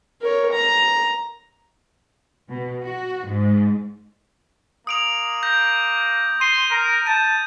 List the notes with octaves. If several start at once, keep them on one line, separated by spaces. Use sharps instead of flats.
A#4 C#5
A#5
B2
F#4
G#2
A#3 D#6 D7 F7
G6 A#6
C6 D#7
A#4
A5 G6 D#7